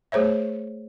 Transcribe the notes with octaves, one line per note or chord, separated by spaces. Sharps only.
A3 G#4 C5 C#5 E5